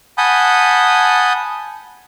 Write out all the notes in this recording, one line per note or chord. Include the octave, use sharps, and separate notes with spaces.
F#5 G#5 A5 B5 D#6 G6